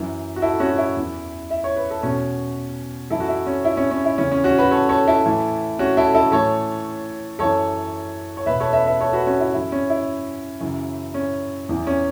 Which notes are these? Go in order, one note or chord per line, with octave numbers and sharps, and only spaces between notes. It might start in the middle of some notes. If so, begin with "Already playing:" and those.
Already playing: F#2 E3
F#4
E4 A4
C#4 F#4
F#4
E4
E2 E3
E5
C#5
B4
A4
E2 B2 C#4 F#4
F#2 E3 E4 A4
F#4
E4
C#4
E4
C#4
C#4
E4
E2 C#3 E3 C#4
C#4
C#4 F#4
F#4 B4
A4 C#5
A4 C#5
E4 A4
A2 E3
C#4 F#4
E4 A4
E4 A4
A2 E3 A4 C#5
F#2 E3 A4 C#5
C#5
E2 B2 B4 E5
A4 C#5
B4 E5
B4 E5
A4 C#5
F#4 B4
C#4 F#4
E4
F#2 E3 E4
C#4
E4
F#2 C#3 E3
C#4
E2 E3
C#4